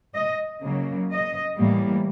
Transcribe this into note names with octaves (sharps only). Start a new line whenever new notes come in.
D#5
C#3 F#3 A#3
D#5
A2 E3 G3 A#3